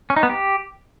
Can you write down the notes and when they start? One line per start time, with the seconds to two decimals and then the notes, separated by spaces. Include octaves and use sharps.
0.10 C#4
0.16 D#4
0.23 B3
0.29 G4